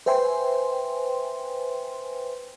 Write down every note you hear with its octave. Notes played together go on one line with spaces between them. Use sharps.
B4 C5 E5 G5 G#5 C6